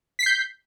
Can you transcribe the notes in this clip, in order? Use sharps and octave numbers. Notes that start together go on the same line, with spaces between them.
G6 B6 C7